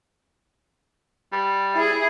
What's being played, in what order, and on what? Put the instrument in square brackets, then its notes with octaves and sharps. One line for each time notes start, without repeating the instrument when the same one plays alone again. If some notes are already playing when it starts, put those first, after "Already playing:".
[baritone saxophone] G3
[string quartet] E4 G#4